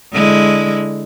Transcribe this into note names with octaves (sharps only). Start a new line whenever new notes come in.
D3 G#3 E4